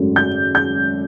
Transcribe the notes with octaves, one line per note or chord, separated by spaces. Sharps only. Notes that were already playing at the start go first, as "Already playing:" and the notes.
Already playing: G#1 F#2 C#3 F#3 A3
G6
G6